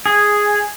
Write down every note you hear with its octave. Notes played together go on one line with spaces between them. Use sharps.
G#4